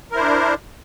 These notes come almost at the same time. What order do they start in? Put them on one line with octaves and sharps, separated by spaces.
A#4 E4 C5 D4